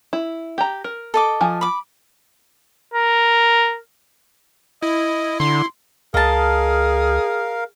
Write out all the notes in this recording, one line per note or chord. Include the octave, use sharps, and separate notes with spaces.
E4
G4 A#5
A#4
A4 D#5 D6
F3 G#5
B5 D6
A#4
E4 D#5
D3 C6
C#2 G#4 A#4 D#5 F5 A5